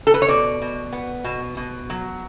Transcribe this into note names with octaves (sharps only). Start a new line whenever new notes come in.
A4
B4
C#5
B2 D5
B2
B3
B2
B2
F#3